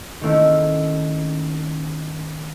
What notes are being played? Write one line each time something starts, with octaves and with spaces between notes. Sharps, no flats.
D#3 A3 A#3 C4 C#4 E4